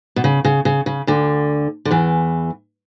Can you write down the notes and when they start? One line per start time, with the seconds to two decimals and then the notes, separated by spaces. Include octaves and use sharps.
0.16 B2
0.24 C#3
0.45 C#3
0.65 C#3
0.86 C#3
1.07 D2 D3
1.85 D3
1.91 E2 E3